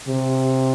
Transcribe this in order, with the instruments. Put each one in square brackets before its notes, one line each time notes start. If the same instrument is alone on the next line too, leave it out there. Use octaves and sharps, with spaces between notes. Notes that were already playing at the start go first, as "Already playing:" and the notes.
[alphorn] C3